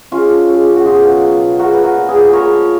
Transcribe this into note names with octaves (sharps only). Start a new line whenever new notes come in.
G#3 C#4 F4
F3
C#3
C#3
F#4
B2 F4 G#4
F#3
F#3
B2
G#3 F#4 A#4
F3 B4
F#4 A#4
A#2
G#4 B4
A#2
G#3 A#4 C#5
F3